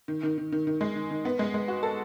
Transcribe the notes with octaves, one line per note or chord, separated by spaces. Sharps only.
D#3
D#3
D#3
D#3
D#3
G#3
D#3
D#3
B3
G#3
G#3
F#4
A4